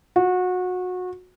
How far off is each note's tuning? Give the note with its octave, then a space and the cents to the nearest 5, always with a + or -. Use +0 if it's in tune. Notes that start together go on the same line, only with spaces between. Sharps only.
F#4 -25